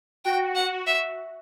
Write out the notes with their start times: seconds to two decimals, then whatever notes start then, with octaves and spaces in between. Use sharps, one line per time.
0.25 F#4 G5
0.55 F#5
0.87 E5